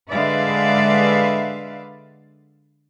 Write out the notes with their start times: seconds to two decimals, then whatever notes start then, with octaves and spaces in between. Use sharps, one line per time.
0.12 D3 G#3 B4 D5 E5 F5